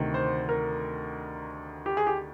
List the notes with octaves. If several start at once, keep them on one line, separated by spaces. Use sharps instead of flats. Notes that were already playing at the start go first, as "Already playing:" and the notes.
Already playing: D2 C3 D#3
C5
A#4
G4
G#4
G4